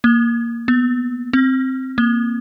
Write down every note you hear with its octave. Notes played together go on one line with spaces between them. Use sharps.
A#3
B3
C4
A#3